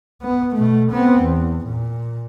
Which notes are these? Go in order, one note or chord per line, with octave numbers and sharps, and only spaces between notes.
B3
B2 A3
B3 C4
E2
A#2